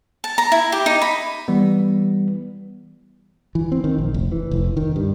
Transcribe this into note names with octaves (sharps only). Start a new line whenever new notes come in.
A5
A#5
E4
G4
D#4
B5
E3 G3 B3
E3
C4
D#3
A#1
F1
E3
F1
D#3
G2